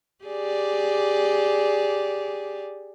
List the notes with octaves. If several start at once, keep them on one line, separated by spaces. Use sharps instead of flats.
G4 G#4 D5